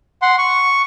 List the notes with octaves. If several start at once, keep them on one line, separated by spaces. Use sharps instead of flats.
F#5 C6
C#6